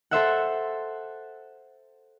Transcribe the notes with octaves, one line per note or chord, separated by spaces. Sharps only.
A4 C5 E5 F#5